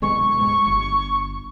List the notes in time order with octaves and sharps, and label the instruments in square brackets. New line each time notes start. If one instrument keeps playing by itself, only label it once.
[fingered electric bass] D1 B2 G#3 [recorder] C#6
[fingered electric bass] G#2 G#3
G1